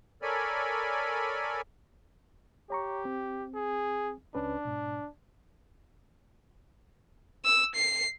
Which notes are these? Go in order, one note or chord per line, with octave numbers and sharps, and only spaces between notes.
A4 A#4 C#5 D5 G#5 B5
G4 C#5 A#5 C#6
C4
G#4
C#2 C#4 D4 B4
G#2 B2
E6
C7